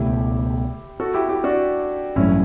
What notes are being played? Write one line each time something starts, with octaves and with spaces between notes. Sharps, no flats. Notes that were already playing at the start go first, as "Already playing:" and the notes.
Already playing: C#2 B2 A3 E4 G4
F#4 A4
E4 G4
E4 G4
D4 F#4
A1 G2 F#3 A3 C#4 E4